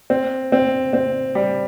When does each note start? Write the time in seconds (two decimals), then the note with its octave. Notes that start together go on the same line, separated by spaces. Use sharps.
0.10 C4
0.52 C4
0.93 C4
1.35 G3